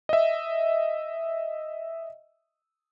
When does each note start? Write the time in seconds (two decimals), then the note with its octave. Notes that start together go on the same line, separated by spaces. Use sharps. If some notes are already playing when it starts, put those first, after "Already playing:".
0.09 D#5 E5